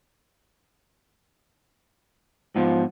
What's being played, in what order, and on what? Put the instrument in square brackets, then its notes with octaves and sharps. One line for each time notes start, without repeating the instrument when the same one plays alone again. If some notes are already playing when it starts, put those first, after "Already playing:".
[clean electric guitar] G#2 B3 [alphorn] F3